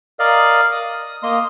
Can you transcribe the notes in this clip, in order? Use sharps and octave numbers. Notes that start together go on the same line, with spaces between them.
A#4 D5 D#5 F5
D#6
A#3 D#5 C6